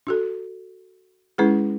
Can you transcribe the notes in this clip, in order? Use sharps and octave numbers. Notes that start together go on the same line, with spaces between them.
D4 F#4 A4
G#3 C#4 E4 G#4 B4